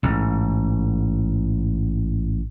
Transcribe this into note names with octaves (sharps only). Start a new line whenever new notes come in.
A1 G#2